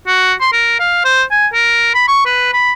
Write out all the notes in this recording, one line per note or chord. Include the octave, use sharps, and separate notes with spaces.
F#4
C6
A#4
F5
C5
G#5
A#4
B5
C#6
B4
B5